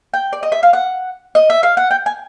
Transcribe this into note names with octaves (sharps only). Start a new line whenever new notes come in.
G5
D5
D#5
E5
F5
F#5
D#5
E5
F5
F#5
G5
G#5